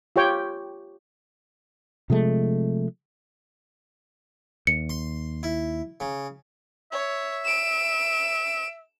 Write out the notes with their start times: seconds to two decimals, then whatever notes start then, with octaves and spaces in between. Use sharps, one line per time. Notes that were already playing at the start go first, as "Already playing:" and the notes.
0.16 F4 G4 C#5 G5
2.10 C3 F3 G#3 A3
4.67 D#2 C#7
4.89 C6
5.43 E4
6.00 C#3
6.92 C#5 E5
7.45 D7 E7